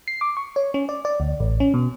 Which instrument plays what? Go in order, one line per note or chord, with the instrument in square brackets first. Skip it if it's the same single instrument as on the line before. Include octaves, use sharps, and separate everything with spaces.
[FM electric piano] C7
D6
C#6
C#5
C#4
D5
D5
D2
A1
C#4
B2